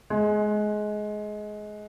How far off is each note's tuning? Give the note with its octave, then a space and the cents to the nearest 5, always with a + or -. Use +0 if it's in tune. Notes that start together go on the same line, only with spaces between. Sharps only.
G#3 +20